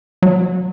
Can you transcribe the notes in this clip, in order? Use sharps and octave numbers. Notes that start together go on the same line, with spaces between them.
F#3